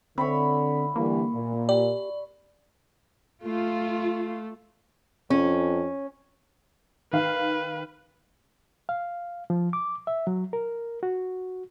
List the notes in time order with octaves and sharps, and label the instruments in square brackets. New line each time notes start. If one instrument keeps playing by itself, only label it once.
[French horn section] D3 [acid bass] C4 [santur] C#5 E5 B5
[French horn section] D3 E3 G3 [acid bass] A#3
[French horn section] A#2
[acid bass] G4 [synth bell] D5
[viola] A3 [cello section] F4
[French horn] F2 [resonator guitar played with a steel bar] C#4
[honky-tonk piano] D#3 F5 [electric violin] B4
[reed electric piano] F5
F3
D6
E5
F#3
A#4
F#4